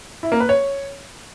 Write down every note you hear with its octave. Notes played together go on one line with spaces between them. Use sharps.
E4
A#3
B4
C#5